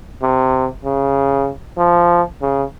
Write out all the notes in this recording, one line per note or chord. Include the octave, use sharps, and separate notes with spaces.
C3
C#3
F3
C#3